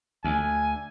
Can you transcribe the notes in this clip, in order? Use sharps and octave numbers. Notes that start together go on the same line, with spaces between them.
D2 G#5